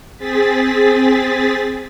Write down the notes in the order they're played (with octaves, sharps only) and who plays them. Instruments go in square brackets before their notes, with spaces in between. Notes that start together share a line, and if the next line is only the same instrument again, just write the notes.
[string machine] C4 G#4 A6 B6